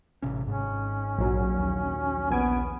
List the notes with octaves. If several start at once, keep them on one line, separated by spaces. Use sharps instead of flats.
A1 C3 C#4
G#1 G#2 C#4
A#1 F#3
D#2
A#1 B3 G#5 D7